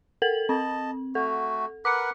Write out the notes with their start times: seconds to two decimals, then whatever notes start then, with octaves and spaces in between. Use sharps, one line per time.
0.22 A4 A#4 F#7
0.49 C4 D#5 A5
1.15 A3 F#4 A4
1.85 A#4 B4 F#5 D6 C#7